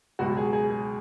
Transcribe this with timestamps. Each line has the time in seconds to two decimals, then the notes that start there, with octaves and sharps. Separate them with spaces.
0.19 C#2 B2 F#3 F#4
0.37 G#4
0.53 G#4
0.70 G#4